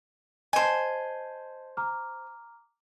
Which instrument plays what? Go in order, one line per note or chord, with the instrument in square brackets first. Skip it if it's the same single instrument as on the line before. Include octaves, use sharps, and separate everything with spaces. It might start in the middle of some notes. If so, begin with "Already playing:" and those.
[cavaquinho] C5 G#5 [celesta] D#5 A5
[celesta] A#5 D6 F6